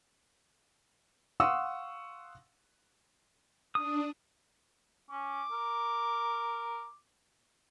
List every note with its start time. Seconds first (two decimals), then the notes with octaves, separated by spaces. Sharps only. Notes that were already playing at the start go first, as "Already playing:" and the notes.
1.40 F5 F#5 C6 C#6 D#6 E6
3.75 D4 D#6
5.11 C#4 D6
5.52 A#4